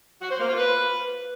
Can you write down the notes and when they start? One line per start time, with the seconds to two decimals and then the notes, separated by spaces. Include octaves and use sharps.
0.22 F#4
0.31 C5
0.40 A#3
0.49 F4
0.58 B4